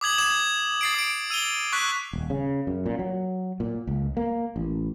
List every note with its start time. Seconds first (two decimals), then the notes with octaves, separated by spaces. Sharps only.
0.01 D6 D#6 G#6 F#7
0.18 D6 D#6 G#6 E7
0.81 A6 C7 D7
0.94 D#6 D7
1.30 E6 D#7 F7 G7
1.73 C#6 F#6 B6
2.13 D#1
2.30 C#3
2.67 F#2
2.86 A#2
2.99 F#3
3.60 A#2
3.87 C#2
4.17 A#3
4.56 A1